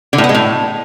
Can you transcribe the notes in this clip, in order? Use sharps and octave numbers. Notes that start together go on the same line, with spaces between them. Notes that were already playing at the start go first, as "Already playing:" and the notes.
D3
A2
B3
G#3
A2